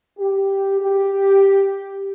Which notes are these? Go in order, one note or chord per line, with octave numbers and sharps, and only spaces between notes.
G4
G4